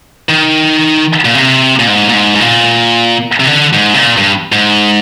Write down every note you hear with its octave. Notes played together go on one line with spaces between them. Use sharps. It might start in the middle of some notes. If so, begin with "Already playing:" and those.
D#3
A#2
C3
A#2
G#2
A#2
G#2
G#2
A#2
C3
D3
G#2
C3
A#2
G2
G#2